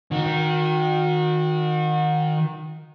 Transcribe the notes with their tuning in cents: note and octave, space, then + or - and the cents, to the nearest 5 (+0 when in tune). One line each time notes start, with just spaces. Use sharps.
D#3 +0 F#4 -35